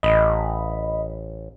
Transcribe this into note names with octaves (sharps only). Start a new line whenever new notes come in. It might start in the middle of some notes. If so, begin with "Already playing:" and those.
A1 D#5 B5